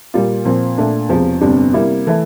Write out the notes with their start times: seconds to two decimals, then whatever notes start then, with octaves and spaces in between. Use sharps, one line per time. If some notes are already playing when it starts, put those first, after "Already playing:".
0.14 A#2 G3 A#3 F4
0.45 A#2 F3 C4
0.77 A#2 A3 D4
1.09 E1 E2 C3 F3
1.41 G1 F2 C3 G3 D4
1.73 C3 G3 A#3 E4
2.07 E3 A3 E4